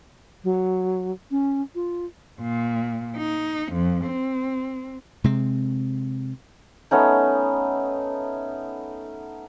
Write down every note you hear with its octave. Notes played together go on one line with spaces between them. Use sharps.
F#3
C#4
F4
A#2
D#4
F2
C4
C3 G#3 C4
A3 B3 C#4 D#4